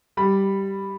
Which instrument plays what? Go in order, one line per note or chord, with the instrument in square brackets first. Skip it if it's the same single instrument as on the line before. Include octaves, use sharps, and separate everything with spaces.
[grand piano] G3 B5